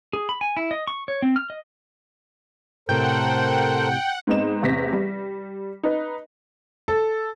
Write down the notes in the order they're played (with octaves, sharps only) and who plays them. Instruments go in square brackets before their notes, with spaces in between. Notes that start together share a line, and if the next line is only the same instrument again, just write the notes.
[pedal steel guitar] G#4
B5
G#5
E4
D#5
C#6
C#5
C4
F6
D#5
[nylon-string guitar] A2 C3 [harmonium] A4 A#4 C5 [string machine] F#5 [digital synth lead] G5
[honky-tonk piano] G#2 B3 C4 D#4 E7
A1 E2 C3 A#6 B6
G3
D#4 B4
[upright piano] A4